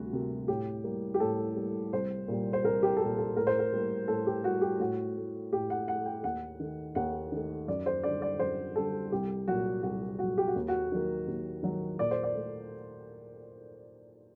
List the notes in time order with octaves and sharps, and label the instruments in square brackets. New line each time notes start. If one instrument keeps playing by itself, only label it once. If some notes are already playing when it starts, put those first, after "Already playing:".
Already playing: [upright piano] D2 C3 G3 F#4
C3 G3 A#3
A2 G4
G3 A#3
G4
A2 A4
G3 A#3
C2 C5
A#2 G3
C5
C2 A#4
G4
A4
A#2 G3 G4
A4
A2 A#4
C5
A#4
G3 A#3
A2 A4
G4
G3 A#3 F#4
G4
A2 F#4
A3
A2 G4
F#5
A3 F#5
G5
D#2 F#5
D#3 A3
D#2 F#5
D#3 A3
F#2 D5
C5
D3 G3 D5
D5
F#2 C5
D3 G3 A4
C2 G4
A#2 F#3 F#4
C2 F#4
A#2 F#3 F#4
G4
F#4
D#2
F#4
D#3 F#3 A#3
D#2
D#3 F#3 A#3
A#2 D5
C5
D5
A3